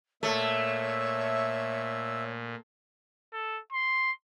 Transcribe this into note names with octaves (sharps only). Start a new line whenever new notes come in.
A#2 A3 C#5 E5
A4
C6